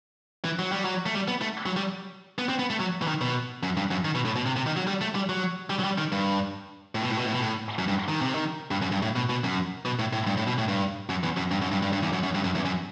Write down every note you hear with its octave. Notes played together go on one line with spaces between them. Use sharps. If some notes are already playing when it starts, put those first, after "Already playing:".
E3
F#3
G3
F#3
A3
G3
B3
A3
F#3
G3
B3
C4
B3
A3
F#3
E3
D#3
B2
F#2
G2
F#2
D#3
B2
A2
B2
C3
C3
D#3
F#3
G3
A3
G3
F#3
G3
F#3
G3
D#3
G2
A2
B2
A2
B2
A2
B2
A2
F#2
G2
D#3
C3
D#3
G2
F#2
G2
A2
B2
B2
F#2
B2
A2
A2
G2
A2
B2
A2
G2
F#2
E2
F#2
G2
F#2
G2
G2
G2
E2
F#2
F#2
G2
F#2
E2
F#2